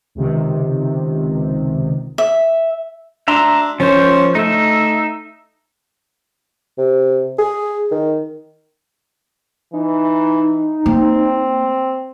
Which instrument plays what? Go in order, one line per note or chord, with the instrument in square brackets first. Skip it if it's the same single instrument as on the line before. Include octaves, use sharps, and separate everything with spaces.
[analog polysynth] C#2 C3 D#3
[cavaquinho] E5
[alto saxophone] D4 [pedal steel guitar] E5 A#5 C6
[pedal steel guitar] F3 C5 [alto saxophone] C#4
[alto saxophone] A3 [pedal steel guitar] D#4 E5
[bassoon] C3
G#4
D#3
[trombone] E3 [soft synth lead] D#4
[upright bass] A#3 [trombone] C4